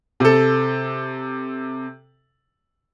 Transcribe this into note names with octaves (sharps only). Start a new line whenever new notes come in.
C3 A4